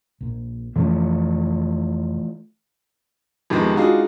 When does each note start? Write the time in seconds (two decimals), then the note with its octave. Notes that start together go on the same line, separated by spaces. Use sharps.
0.21 A#1 A#2
0.76 F2 C3 E3 F3 A3 C#4
3.50 F2 C3 D#3 G#3 B3
3.75 G#3 D4 D#4 F4 F#4 G#4